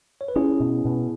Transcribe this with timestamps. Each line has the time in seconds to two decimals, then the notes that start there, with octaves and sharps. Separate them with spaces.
0.21 C#5
0.28 B4
0.36 C#4 E4 G#4
0.60 B2
0.85 B2